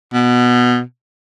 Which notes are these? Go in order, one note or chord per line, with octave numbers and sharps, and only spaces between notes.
B2